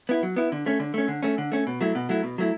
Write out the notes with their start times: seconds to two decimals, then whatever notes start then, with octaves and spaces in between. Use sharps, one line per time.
0.09 B3 E4
0.23 F#3
0.36 B3 E4
0.52 D3
0.66 A3 C#4
0.80 D3
0.94 A3 C#4
1.08 D3
1.23 A3 C#4
1.38 D3
1.52 A3 C#4
1.67 B2
1.81 F#3 A3 E4
1.95 B2
2.09 F#3 A3 E4
2.23 B2
2.38 F#3 A3 E4